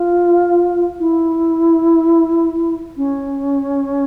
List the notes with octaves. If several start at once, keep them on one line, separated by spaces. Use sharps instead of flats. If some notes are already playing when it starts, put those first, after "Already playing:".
Already playing: F4
E4
C#4